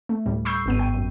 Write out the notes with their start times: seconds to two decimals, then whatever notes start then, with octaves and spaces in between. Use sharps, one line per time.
0.09 A3
0.26 D2 A2 G3
0.45 B5 C#6 E6 G6 C7
0.66 G#1 B3 D#7
0.79 G5
0.94 F#2